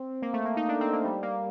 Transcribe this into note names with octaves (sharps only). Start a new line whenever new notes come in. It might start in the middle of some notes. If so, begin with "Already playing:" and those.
Already playing: C4
A#3
A3
A#3
D#4
D4
C4
A#3
G3
A#3